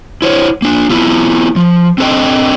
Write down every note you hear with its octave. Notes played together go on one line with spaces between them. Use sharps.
E4 C5 C#5
A#3 D4
B3 E4 F4
F3
C4 D4 A4 A#4 D#5 G5